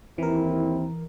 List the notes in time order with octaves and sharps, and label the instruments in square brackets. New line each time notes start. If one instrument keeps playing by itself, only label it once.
[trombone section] D#2 C4 E4 [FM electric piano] E3 A#4